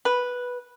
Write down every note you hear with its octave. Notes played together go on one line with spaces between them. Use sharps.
B4